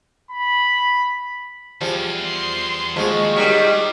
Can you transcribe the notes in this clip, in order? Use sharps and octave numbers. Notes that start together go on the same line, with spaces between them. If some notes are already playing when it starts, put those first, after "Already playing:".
B5
E2 F3 G3 G#4
C6
D#2 F3 G#3 F#4 D#5
F#3 G3 D#4 A#4 C#5 G5